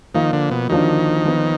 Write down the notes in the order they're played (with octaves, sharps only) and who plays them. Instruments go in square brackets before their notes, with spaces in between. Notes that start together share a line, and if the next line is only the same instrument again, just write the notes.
[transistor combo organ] D#3 [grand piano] F3 A#3 F4
[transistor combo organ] D3
B2
[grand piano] D3 F3 A#3 D4 F#4 [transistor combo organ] D#3
[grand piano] F3 B3 F4